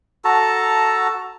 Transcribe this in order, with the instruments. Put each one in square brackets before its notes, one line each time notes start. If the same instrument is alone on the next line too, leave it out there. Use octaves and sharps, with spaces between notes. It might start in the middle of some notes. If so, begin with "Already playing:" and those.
[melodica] F#4 A4 A5 A#5